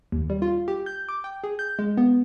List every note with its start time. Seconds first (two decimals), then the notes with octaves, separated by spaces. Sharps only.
0.12 D#2
0.30 G3
0.42 F4
0.68 G4
0.86 G6
1.09 D6
1.24 G5
1.44 G#4
1.59 G6
1.79 G#3
1.97 B3